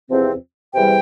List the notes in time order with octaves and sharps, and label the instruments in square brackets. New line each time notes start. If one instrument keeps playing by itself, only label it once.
[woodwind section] E2 C3 F3 C4
E2 C3 E3 G3 G5